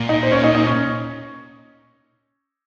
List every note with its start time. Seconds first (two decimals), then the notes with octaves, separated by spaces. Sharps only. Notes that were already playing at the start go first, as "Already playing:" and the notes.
Already playing: A#2
0.09 D#4 D#5
0.23 C5
0.32 C#4 C#5
0.43 D#4 D#5
0.55 D#4 D#5
0.66 C#4 C#5